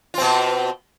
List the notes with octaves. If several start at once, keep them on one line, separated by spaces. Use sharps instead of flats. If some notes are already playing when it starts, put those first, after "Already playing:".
B2 C4 F4